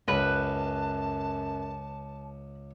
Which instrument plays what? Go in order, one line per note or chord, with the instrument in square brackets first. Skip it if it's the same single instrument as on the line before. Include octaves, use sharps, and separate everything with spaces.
[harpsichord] C#2 [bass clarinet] F#2 [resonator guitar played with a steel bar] B4 [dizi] A5